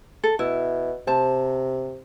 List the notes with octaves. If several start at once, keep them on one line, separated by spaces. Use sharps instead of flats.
A4
B2 E4
C3 C5 A5